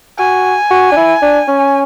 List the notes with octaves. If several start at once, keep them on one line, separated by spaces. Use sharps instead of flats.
F#4 G#5
F#4
D4
E4
D4
C#4